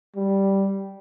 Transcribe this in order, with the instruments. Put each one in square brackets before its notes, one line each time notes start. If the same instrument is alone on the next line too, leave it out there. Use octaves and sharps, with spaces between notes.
[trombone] G3